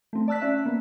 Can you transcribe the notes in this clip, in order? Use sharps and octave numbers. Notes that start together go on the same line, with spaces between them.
A3 C4
D5 A5 E6 F#6 B6
C#4 E5
A#3 B3